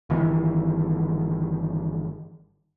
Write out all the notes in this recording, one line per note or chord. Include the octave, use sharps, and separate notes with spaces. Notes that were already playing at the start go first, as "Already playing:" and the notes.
G1 D#3 E3